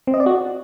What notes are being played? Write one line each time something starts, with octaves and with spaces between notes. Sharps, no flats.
C4
D#5
D5
F#4